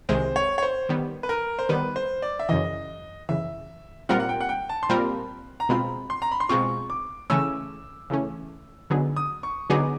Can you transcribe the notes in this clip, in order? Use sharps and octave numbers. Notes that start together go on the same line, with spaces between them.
C2 C3 D#3 G#3 C5
C#5
C#5
C5
D#3 G3 B3
B4
A#4
C5
D#3 G3 B3 B4
C5
D5
E5
F#2 C#3 E3 D#5
F#2 C#3 E3 E5
A#2 G3 C4 F4 A#4 F#5
F#5
G5
F#5
G5
A5
C6
A#2 G3 C4 F4 A#4 B5
A#5
B2 G#3 C4 F4 B5
C6
A#5
B5
C6
B2 G#3 C4 F4 C#6
D6
C#3 E3 A3 C#4 E6
C#3 E3 A3 C#4
D3 F#3 B3 D#4 G#4
D#6
C#6
D3 F#3 B3 D#4 G#4 D6